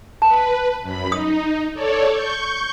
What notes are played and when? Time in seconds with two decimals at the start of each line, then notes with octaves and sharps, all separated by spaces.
0.22 B4 A5
0.82 F#2 B5
1.12 D#4 D#6
1.74 A4 C#5 D5
2.10 C#6 G6